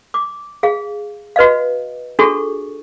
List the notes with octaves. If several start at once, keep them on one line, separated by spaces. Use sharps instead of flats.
D6
G#4 F5
F#4 B4 D#5 F5
D4 F4 F#4 G#4 A4 C#6